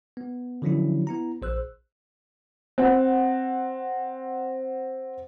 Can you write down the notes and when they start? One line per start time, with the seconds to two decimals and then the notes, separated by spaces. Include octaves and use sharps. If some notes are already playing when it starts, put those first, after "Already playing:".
0.17 B3
0.62 D3 F3 F#3 C#4 D4 E4
1.07 B3 E4 A#5
1.42 A#1 C5 E6 F#6
2.78 C4 F#5